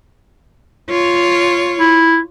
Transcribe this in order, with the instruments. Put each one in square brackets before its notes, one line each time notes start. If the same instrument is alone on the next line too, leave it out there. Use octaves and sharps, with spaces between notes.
[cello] F4 C#5
[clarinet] E4